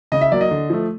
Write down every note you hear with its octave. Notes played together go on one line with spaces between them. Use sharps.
C#3 D#5
E5
F#3 A#3 D5
D#5
D3
F3 A3